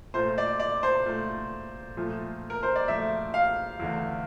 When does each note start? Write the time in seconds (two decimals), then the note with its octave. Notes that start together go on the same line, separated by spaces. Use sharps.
0.14 A#2 A3 C5
0.38 D5
0.60 D5
0.83 C5
1.06 A#2 A3
1.97 A#2 F3 A3
2.50 A#4
2.63 C5
2.75 D5
2.88 A#2 F3 A3 E5
3.34 F5
3.79 E2 D3 A3